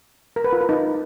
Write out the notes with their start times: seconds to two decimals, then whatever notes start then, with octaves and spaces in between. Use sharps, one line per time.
0.36 A#4
0.44 B4
0.53 F4
0.61 A#4
0.69 D#4